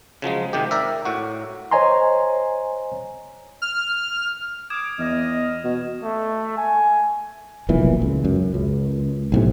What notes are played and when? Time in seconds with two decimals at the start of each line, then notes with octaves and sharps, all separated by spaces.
0.22 C#3 F3 F#3 G#3
0.53 G#2 C3 D#3 G4
0.71 A#4 D5 E5
1.05 A2 F#4
1.71 C5 C#5 D#5 G#5 A#5 C6
3.62 F6
4.70 D6 D#6 G#6 E7
4.99 E2 D#5 F6
5.64 B2
6.03 A3
6.58 G#5
7.69 F1 B1 A#2 E3
8.02 C#2
8.24 F#2
8.54 C#2
9.32 B1 A2 C3